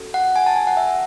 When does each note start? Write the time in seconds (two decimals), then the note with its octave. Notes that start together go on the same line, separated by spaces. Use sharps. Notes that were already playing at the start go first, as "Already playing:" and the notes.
Already playing: C#4 F#4 A4
0.14 F#5
0.36 G#5
0.46 A5
0.56 G#5
0.67 F#5
0.77 E5